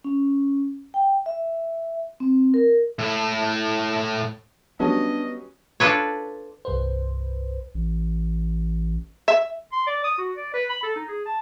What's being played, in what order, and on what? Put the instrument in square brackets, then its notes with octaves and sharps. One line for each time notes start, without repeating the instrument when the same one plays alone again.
[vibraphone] C#4
G5
E5
C4
A#4
[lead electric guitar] A2 E4
[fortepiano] F#3 G3 C#4 [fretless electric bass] B3 [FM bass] D4 [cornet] D#5
[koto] D4 F4 A4 B4 C#5
[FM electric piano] C2 G2 B4 C5
[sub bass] A1
[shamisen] E5
[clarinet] C6
D5
D#6
F#4
D5
B4
B5
A4
D#4
G#4
A5